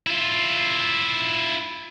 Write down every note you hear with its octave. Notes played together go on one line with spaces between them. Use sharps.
E4 F4